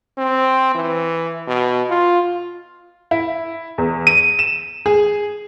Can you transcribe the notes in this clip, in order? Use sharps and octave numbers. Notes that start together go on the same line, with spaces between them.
C4
E3
B2
F4
E4
E2
D#7
E7
G#4